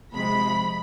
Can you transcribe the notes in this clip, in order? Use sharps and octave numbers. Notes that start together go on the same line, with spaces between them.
C3 F3 G#3 B5